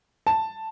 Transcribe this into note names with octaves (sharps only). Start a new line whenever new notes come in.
A5